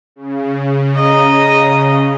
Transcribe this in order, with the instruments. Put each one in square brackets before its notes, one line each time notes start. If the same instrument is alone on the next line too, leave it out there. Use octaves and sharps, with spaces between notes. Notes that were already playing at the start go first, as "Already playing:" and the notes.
[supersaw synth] C#3
[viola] D#5 A#5